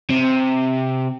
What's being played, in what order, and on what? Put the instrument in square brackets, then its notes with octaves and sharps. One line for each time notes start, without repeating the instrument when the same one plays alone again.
[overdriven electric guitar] C3